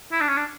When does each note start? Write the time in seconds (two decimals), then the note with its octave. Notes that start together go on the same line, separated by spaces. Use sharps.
0.12 E4
0.21 D4
0.28 C#4
0.37 D4